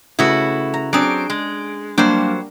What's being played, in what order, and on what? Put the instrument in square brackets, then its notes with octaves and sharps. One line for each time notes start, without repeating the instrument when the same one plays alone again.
[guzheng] C#3 A3 B4 [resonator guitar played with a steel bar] E4 F#4
[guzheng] A#5
[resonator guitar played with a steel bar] F#3 C4 [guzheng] D4 G#4 D5 [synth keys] D7
[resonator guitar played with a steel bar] G#3
[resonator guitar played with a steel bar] F#3 C5 [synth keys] G3 A#3 D4 [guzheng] G5